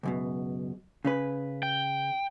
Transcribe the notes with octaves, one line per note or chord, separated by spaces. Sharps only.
C#2 F#2 B2
C#3 C#4 B4
G5